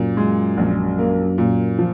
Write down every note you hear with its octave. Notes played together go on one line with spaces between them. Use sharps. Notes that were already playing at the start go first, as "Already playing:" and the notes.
Already playing: F#2 A#2
G#3
A#1
A#3
A#2
F3